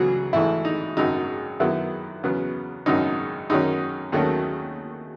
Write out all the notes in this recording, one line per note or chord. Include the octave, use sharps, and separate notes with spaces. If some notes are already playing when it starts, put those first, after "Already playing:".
Already playing: C#2 C#3 E3 F#3 B3 F#4 G#4
A1 G#2 E3 A3 E4
D#4
G#1 F#2 C#3 F#3 D#4
F#2 D#3 F#3 B3 E4
E2 C#3 F#3 B3
G#1 F#2 C#3 F#3 C#4 D#4
F#2 D#3 F#3 C#4 D#4
D#2 D#3 F#3 A3 C#4 F#4